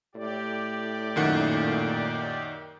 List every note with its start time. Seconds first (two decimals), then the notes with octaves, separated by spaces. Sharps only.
0.15 A2 G4 D5
1.16 F#2 A#2 D#3 F#5